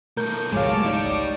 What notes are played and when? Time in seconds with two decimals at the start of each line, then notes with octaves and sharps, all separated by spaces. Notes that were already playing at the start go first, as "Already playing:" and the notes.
0.17 B2 A3 A#4 G6
0.52 G#1 C#2 F#3 G#3 C#5 F5 A5 D6
0.86 D#4 G4 D5